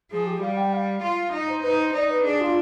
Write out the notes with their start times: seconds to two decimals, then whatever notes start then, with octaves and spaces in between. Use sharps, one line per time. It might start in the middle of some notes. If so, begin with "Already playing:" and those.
0.11 F3 G#4
0.26 G4
0.42 G3 F5
0.56 G5
0.73 F5
1.03 F4
1.33 D#4 D#5
1.49 C5
1.63 D#4 B4
1.78 C5
1.94 D#4 D5
2.10 B4
2.25 D4 G#4
2.40 F4